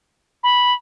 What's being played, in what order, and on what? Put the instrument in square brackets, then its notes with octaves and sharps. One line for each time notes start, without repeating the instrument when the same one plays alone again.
[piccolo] B5